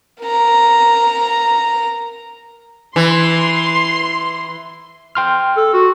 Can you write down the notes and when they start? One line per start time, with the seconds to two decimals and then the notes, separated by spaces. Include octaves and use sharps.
0.23 A#4 A#5
2.96 E3 C6
5.15 G5 C6 F6
5.57 A4
5.74 F#4